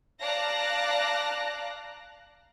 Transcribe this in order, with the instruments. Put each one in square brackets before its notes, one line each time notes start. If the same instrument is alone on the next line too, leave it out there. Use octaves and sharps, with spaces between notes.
[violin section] D5 F5 A5 A#5 F#6 A#6